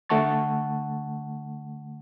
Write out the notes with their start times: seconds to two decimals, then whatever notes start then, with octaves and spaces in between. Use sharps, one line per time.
0.09 D3 A3 F#5 A5 C#6 A6